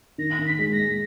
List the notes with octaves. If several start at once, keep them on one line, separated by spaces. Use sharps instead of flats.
D#3 A#6
D#3
B6
G#3
A#6
G#3